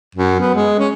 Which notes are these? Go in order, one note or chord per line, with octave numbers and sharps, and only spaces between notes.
F#2
B3
G#3
C#4